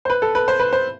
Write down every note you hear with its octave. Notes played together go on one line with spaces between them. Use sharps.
C5
B4
A4
B4
C5
B4
C5